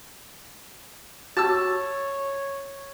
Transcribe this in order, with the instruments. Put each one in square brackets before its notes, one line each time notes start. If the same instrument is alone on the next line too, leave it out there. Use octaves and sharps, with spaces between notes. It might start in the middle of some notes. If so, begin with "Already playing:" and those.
[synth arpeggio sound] F#4 G4 E6 [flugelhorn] C#5 [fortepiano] A5